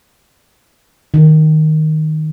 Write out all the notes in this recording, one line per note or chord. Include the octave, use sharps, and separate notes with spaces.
D#3